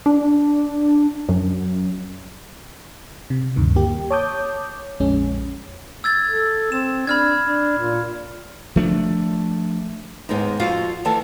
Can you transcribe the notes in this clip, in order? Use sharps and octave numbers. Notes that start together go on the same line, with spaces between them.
D4
F#2
C3
D2 G2 D#3
A#3 G4
C#5 A5 D6 D#6 G6
A#1 F2 G#3 C#4
E6 G#6 A6
A4
C4 E7
D4 B5 F6 G#6
D4
A#2
F3 A3 D4
D#2 G#2 G#3 B3 D#4
F2 F4 F#4 F5
D2 D#3 E3 A3 A5